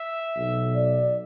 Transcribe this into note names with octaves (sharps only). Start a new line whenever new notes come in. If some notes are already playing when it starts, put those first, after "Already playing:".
Already playing: E5
B1 B2
D5